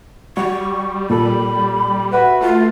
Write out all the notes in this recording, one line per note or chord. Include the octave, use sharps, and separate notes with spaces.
G3 F#4 C#6
A#2 A4 B5
F#4 B4 E5
A3 F4